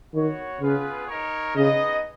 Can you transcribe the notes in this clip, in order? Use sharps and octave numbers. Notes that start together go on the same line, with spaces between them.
D#3 B3 F#4 C#5
C#3 B3 F4 G#4 B4 F5
D#4 A#4 C#5
C#3 B3 D#4 G#4 D#5